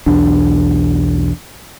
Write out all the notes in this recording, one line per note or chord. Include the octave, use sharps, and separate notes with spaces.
B1 E2 D4